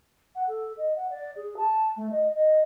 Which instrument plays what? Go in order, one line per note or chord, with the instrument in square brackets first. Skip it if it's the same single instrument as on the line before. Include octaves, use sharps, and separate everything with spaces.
[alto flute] F#5
A4
D#5
F#5
D5
G#4
A5
A3
D#5
D#5